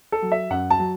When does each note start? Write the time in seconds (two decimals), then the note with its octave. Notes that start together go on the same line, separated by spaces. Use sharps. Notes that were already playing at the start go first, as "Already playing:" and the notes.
0.12 A4
0.22 F#3
0.32 E5
0.50 F#2 F#5
0.71 A5
0.79 F#3